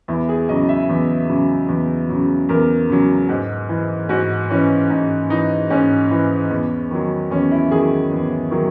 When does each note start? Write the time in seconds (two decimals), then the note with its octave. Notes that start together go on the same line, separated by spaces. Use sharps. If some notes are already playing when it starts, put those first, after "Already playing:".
0.08 E2 E4
0.29 G#4
0.49 C#3 F#3 D#5
0.69 E5
0.89 E2
1.29 C#3 F#3
1.68 E2
2.09 C#3 F#3
2.49 E2 A#4
2.89 C#3 F#3
3.29 G#2
3.69 E3
4.09 G#2 F#4
4.50 E3 C#4
4.90 G#2 D#4
5.30 E3 D#4
5.70 G#2 C#4
6.11 E3
6.50 E2
6.91 D#3 F#3
7.30 E2 C#4
7.52 E4
7.71 D#3 F#3 G#4
8.12 E2
8.52 D#3 F#3